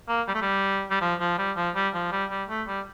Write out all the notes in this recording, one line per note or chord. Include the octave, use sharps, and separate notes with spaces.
A#3
G3
A3
G3
G3
F3
F3
G3
F3
G3
F3
G3
G3
A3
G3